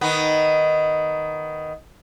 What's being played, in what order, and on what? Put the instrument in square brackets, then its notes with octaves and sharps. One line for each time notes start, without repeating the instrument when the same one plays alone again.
[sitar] D#3 B3